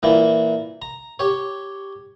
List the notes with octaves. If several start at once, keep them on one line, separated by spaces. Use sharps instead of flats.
A#2 E3 E4 G5
A#5
G4 C#5